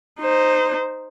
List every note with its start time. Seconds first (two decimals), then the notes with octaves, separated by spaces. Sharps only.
0.20 D#4 C5